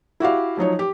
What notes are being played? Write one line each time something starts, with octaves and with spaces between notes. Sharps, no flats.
E4 F#4 G4 F5
F3 F#3 D#4 C#5
G4